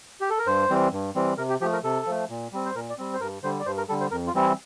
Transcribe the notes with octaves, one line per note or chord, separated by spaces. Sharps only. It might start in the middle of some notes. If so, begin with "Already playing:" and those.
G4
A4
A#4
G2 C5
E3 G3 C4
G2
E3 G3 C4
C3 A#4
G4
F3 A3 G4
A#4
C3 A4
F3 A3
A#2
G3 C4
C5
A#2 A#4
D5
G3 C4
C5
G2 A#4
D3 G3 C5
D5
G2 C5
A#4
D3 G3 A4
C5
F2 A#4
F4
E3 G3 C4
E4